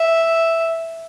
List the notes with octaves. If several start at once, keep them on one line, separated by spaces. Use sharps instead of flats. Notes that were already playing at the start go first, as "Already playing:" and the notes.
Already playing: E5